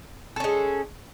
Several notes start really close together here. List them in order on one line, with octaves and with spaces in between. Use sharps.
A4 C#4 G#3